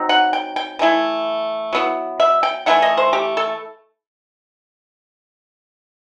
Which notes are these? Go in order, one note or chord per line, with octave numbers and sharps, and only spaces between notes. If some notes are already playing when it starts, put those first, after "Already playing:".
Already playing: F#3 C4 D#4
F#5
G5
G5
E3 A3 E4
F#3 B3 E4
E5
G5
E3 A3 E4 F#5
D#5
C5
G4
A4